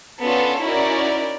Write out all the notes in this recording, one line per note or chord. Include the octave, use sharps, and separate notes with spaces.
B3 C#4 D4 F4 A4
C#4 D#4 E4 F#4 A#4 D5